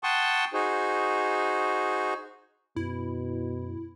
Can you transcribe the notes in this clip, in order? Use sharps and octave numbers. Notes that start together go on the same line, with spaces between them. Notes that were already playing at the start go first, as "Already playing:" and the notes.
F#5 G5 A5 C6 C#6 D#6
D#4 F#4 G#4 C5
F#2 B2 E4